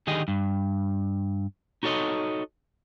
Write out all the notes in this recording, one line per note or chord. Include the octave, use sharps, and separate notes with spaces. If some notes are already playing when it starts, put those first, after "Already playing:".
D3 D#3 G4 G#4 D#5
G2
D#4 F#4 A4 C#5 D#5